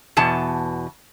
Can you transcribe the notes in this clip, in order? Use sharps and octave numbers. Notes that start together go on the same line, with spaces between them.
E2 B2 A5